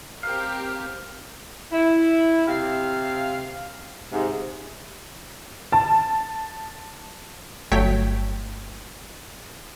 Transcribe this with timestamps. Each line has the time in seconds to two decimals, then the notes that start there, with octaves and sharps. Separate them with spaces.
0.23 C4 G4 A#4 F5
1.72 E4
2.48 C3 F5
4.12 G#2 C3
5.72 A5
7.72 G1 F#3 A3 C#5 G5 B6